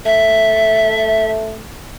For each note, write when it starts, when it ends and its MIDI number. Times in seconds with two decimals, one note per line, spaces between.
0.06 1.61 57
0.06 1.31 76